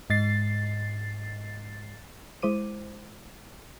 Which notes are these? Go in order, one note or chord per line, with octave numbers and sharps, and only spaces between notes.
G#2 A6 C7
G#3 E4 C5 D6 D#7